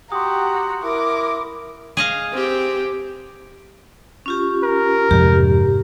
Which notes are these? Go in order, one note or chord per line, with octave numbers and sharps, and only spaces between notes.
F#4 G4 A#5 C6 D#6
E4 A#4 D6
G#4 D#5 F5
C4 G4
C#4 F4 G4
A#4
F2 G#2 C3 G4